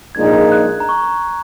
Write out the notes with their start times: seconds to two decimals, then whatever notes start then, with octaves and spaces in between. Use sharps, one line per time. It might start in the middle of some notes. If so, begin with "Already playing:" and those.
0.15 A#1 A#2 G#3 D#4 G#6
0.52 F#6
0.80 A#5
0.89 C#6